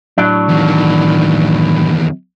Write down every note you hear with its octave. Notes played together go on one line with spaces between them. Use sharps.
A2 F#3 D4
E2 D#3